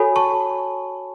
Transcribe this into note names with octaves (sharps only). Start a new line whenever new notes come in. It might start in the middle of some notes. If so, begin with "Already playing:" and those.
Already playing: F#4 A4 C#5 G#5 B5
A5 C#6